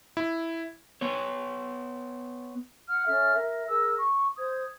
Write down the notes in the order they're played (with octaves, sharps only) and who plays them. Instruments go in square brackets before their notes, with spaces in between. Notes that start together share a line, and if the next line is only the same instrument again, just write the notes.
[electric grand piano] E4
[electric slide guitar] B3 C#5
[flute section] F#5 F6
C#4 A4 E5 F6
A#4 E5
G#4 A#4 E6
C#6
C5 D#6 G#6